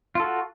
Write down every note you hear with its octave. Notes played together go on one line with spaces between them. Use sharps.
F4 F#4 A4